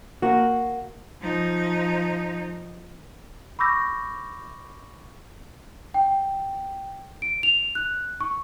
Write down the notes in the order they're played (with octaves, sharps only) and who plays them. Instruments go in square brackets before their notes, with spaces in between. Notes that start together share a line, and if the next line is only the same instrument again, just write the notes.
[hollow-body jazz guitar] A#3 F#4
[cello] F3 D#4
[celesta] B5 C#6 D6 E6 G6 A#6
G5
D7
F7
F#6
C#6